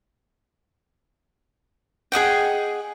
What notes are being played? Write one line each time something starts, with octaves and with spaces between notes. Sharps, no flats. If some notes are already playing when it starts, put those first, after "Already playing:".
G#4 D#5 F#5 G5